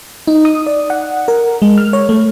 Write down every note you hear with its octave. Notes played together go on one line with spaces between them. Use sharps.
D#4
D#6
D5
F#5
A#4
G#3
F6
C#5
A3